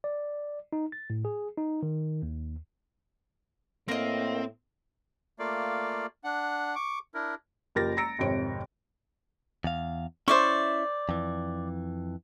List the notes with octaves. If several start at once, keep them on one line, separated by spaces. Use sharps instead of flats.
D5
D#4
A6
A2
G#4
D#4
D#3
D#2
A2 A#3 C4 A#4 D#5
A3 A#3 F4 D5 F5
D4 F#5
C#6 D6
D4 E4 A#4
F#1 F3 G4 A#4 A6 A#6
A#5 E6 A#6 C#7 D7
G#1 F2 C3 C#5 D7
E2 F5
C#4 E4 C5 D5 E5 C#6
F2 E3